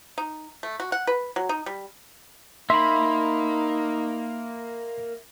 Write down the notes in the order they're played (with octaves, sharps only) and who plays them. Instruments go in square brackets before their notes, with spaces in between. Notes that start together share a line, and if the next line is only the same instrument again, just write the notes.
[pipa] D#4
A3
F#4
F#5
B4
F#3
D#4
G3
[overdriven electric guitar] A#3 [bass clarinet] D#4 [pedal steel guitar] E5 B5 [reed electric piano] C6